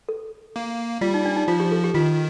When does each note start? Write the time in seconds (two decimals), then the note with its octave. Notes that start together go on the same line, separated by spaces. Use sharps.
0.09 A4
0.56 A#3
1.01 G3 F4
1.14 D#4
1.25 D4
1.36 D#4
1.48 F3 F4
1.60 G4
1.72 A4
1.84 G4
1.94 D#3 F4